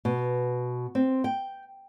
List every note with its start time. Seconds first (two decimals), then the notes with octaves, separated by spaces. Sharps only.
0.05 B2
0.95 C4
1.24 G5